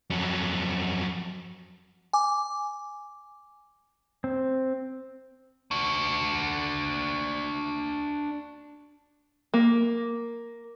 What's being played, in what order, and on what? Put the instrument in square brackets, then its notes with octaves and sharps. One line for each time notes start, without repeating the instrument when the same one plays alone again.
[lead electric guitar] F2 F#3
[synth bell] G#5 D6
[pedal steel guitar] C4
[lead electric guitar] D4 F#4
[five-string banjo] A#3